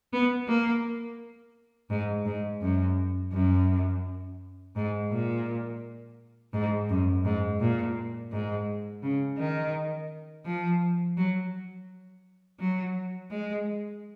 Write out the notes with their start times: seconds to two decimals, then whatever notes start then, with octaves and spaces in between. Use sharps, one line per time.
0.13 B3
0.47 A#3
1.90 G#2
2.25 G#2
2.62 F#2
3.33 F#2
4.76 G#2
5.11 A#2
6.53 G#2
6.89 F#2
7.25 G#2
7.60 A#2
8.32 G#2
9.03 C#3
9.38 D#3
10.45 F3
11.17 F#3
12.59 F#3
13.31 G#3